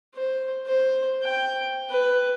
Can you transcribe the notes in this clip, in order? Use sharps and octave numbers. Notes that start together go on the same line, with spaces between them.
C5
C5
G5
B4